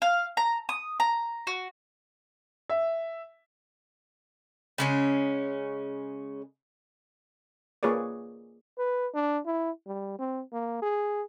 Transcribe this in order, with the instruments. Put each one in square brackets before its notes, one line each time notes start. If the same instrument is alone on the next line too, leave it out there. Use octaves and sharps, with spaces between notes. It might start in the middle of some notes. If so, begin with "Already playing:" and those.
[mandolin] F5
A#5
D#6
A#5
F#4
[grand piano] E5
[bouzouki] C#3 G#3 C#4
[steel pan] A#3 F4 G#4 B4 C#5 D5
[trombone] B4
D4
E4
G3
C4
A#3
G#4